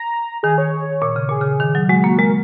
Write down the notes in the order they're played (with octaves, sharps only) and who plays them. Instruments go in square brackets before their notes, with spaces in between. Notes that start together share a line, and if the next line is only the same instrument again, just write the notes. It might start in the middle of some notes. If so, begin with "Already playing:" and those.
Already playing: [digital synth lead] A#5
[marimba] D#3 [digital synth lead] G#4
[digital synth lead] C#5
[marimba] A#2
C#3
[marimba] A#2 [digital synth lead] G#4
[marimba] C#3
D#3
F#3
[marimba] G#3 [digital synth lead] F#4
[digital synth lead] F#4
[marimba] A#3
[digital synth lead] F#4
[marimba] G#3 [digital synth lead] A#4